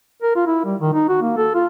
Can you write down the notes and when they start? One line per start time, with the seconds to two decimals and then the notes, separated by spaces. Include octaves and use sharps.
0.22 A#4
0.36 F4
0.47 E4
0.65 G3
0.81 D#3
0.93 D#4
1.09 F#4
1.22 A#3
1.37 A4
1.54 F4